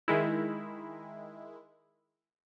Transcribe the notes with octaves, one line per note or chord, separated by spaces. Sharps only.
D#3 G#3 E4